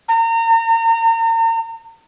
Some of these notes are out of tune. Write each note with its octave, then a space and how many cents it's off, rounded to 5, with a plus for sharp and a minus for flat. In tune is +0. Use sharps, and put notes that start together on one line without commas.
A#5 -35